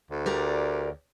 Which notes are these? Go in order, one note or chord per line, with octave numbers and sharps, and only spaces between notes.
D2
G4 A#4 D5